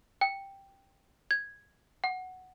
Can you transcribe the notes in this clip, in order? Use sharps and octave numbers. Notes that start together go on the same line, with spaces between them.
G5
G#6
F#5